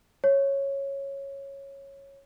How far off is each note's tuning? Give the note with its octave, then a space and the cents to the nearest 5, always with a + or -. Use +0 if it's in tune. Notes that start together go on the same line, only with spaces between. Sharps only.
C#5 -10